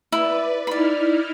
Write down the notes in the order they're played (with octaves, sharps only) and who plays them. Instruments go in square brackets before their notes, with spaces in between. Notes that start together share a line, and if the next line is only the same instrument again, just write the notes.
[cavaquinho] E4 [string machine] B4 D5
[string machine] D#4 E4 F6 [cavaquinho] D5 B5